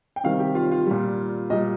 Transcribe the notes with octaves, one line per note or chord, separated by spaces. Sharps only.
G5
C3 D#3 G3 F5
G4
F4
F4
A#2 G3
A#2 G3 D#5